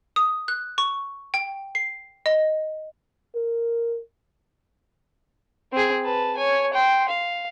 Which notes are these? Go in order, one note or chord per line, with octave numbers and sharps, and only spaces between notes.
D#6
F#6
C#6
G5
C7
D#5
A#4
C4 G#4
B4 A5
C#5 G#5
G5 C6
F5